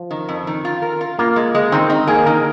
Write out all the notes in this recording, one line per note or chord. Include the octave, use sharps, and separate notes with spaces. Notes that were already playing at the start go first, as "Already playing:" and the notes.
Already playing: F3
D#3
F2
D#3
F4
A#4
F4
A#3 F4
G#3
G#3
D#3 C4
D#4
A#3 G#4
D#3 A#4